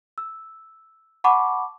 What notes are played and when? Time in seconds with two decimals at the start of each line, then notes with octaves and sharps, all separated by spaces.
0.18 E6
1.24 F#5 A5 B5 C#6 D6